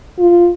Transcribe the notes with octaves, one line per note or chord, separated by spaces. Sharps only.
F4